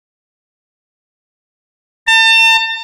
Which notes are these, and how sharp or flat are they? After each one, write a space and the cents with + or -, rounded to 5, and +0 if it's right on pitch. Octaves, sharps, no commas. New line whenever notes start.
A5 +40